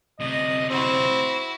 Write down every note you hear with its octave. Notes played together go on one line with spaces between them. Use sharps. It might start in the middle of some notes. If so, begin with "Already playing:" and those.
D2 C3 D#5
C4 E4 F#4